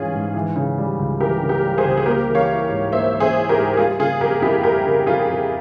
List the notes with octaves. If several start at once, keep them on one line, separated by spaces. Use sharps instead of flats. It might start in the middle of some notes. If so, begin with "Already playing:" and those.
Already playing: G#2 E3 G3 C#4 F4 G#4
G#2
E3
C#3
G3
C#2
E3 G4 A#4
C#3
G4 A#4
G3
G#4 C5
C#2
G#4
A#3 G4 A#4
E3
C#5 F5
E4
G#2
A#3 C5 E5
E3
G#4 C5
E4
G4 A#4
G#2
G3 F4 G#4
C#3 F4 G#4
F2 G4 A#4
F2 E4 G4
G3 G4 A#4
C#3
F2 F4 G#4
F2